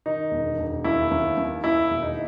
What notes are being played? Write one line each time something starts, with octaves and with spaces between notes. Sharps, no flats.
D#3 D#4
E1
E1
D#2 E4
D#2
D#2
D#2 E4
E1
D#4